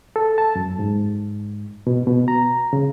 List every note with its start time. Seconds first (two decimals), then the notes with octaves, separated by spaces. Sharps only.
0.16 A4
0.38 A5
0.55 F#2
0.79 G#2
1.87 B2
2.07 B2
2.28 A#5
2.73 C#3